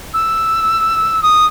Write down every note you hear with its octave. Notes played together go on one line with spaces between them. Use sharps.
E6
D#6